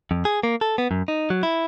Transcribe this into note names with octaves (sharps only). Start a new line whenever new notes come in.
F2
G#4
A#3
A4
B3
F#2
D#4
F#3
E4